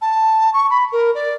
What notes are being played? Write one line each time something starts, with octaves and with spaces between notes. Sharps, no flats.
A5
C#6
B5
A#4
D5